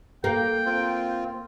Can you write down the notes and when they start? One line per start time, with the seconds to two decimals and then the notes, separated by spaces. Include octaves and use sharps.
0.24 A#3 G5
0.66 C4 F4